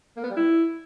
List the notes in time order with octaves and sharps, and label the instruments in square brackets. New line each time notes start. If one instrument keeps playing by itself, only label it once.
[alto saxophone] A#3
B3
G3
E4